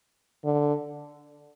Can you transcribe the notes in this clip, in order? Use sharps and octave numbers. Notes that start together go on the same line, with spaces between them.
D3